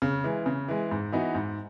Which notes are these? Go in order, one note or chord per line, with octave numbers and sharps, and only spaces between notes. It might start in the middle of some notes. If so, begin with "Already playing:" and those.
C#3
E3 G#3
C#3
E3 G#3
G#2
E3 B3 D#4 F#4
G#2